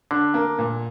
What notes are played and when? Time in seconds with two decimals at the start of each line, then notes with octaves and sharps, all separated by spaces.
0.11 D3 D4
0.34 A#3
0.59 A#2